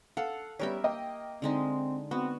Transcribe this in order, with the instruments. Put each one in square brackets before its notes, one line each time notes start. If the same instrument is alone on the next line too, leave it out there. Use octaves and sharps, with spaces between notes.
[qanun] A4 [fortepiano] F5 F#5
[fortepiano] G3 B3 C#4 [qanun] G4 A#4 E5
[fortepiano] A#3 D#5 G5
[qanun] D3 G#3 D#4 [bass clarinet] C4
[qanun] B3 [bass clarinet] C4 [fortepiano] F#4